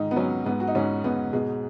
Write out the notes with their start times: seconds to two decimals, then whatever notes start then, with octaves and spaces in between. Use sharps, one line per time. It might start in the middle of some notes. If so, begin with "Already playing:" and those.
Already playing: G#2 D#3 D#4
0.11 B3
0.16 F#3 C#4
0.46 G#2 B3
0.60 F#4
0.67 D#4
0.75 G#2 C#4
1.04 G#2 B3
1.33 B2 G#3